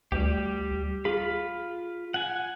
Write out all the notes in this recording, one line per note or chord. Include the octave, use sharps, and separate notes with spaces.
D2 G3 G4
F4 G#4 B5
F#5 G#5